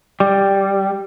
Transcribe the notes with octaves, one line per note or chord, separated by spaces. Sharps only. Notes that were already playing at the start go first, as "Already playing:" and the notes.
G3